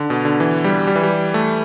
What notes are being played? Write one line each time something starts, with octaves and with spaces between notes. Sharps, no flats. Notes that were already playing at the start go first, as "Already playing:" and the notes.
Already playing: D3
B2
D3
E3
G3
G3
E3
G3
A3